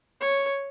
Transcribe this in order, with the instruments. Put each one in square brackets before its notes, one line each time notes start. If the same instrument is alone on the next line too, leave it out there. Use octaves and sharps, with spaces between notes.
[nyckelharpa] C#5